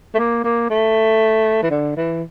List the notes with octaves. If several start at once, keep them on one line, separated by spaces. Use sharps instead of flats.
A3
A#3
A#3
A3
E3
D3
E3